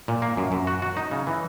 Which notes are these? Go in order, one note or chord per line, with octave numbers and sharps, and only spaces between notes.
A#2
A#3
F#2
F#2
F#4
F#4
D#4
C#3
E3